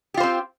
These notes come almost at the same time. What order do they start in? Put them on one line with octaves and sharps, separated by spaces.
G4 F4 C5 C4